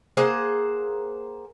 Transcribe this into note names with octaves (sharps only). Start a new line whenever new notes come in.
A#3 G#4 C5 F#5